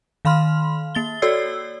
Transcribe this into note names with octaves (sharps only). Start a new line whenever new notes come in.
D#3 F5 B5 C6 F6
A#3 A6 G7
F#4 A4 C#5 D5 E6 C7